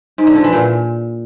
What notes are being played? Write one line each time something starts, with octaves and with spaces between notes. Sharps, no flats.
G#2
D3
F3
E3
A#2